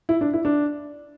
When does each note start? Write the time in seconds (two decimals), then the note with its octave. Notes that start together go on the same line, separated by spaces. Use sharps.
0.09 E4
0.21 D4
0.33 E4
0.45 D4